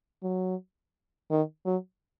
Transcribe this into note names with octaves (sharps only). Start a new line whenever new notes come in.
F#3
D#3
F#3